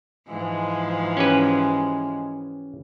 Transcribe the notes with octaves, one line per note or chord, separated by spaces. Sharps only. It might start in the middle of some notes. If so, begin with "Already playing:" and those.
G#2 E3 F3 G#3
C#4 G4 B4